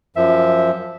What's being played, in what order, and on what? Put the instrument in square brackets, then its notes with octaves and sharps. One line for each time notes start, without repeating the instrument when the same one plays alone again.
[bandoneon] F#2 F3 [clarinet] E5